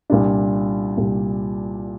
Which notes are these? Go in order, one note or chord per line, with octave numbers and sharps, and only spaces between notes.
C2 A#2 G3 D4
C2 A#2 G3